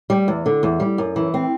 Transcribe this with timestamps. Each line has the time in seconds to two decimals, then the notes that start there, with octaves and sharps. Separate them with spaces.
0.10 G3
0.28 E2
0.46 D3
0.63 E2
0.80 G3
0.98 F#2
1.16 E3
1.34 C4